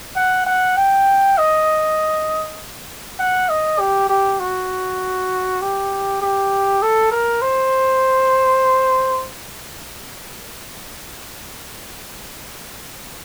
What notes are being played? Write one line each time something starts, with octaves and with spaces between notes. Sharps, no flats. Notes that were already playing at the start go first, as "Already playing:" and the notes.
F#5
F#5
G5
D#5
F#5
D#5
G4
G4
F#4
G4
G4
A4
A#4
C5